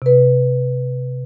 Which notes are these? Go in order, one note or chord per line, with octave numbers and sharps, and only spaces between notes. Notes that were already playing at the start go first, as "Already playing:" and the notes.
C3 B4